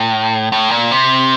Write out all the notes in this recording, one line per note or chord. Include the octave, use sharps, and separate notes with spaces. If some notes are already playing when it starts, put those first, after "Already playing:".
Already playing: A2
A2
A#2
C3